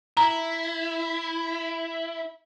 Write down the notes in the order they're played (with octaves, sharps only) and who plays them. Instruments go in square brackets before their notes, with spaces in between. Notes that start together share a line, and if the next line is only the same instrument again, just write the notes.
[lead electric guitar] E4 [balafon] A#5